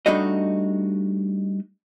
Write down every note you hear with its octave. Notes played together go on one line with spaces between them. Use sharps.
G3 A3 D4 D#4 F#4 D#5